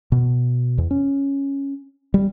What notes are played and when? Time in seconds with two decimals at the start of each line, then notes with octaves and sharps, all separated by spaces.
0.12 B2
0.78 E2
0.91 C#4
2.14 G3